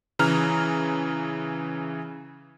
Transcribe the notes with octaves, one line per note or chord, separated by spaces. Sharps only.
C#3 E3 A#5 F6